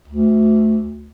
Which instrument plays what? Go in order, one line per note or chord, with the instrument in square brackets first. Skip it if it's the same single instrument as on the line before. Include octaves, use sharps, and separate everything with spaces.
[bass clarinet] D2